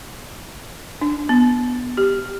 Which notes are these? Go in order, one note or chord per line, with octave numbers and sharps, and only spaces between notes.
D4
B3
G4